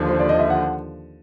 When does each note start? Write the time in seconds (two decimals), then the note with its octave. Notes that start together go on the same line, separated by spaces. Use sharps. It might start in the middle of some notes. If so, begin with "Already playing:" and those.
Already playing: D#2 D3 F3
0.09 C5
0.19 D5
0.29 D#5
0.40 E5
0.50 F#5